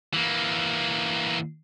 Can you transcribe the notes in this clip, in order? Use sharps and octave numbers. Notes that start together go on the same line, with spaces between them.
E3 A#3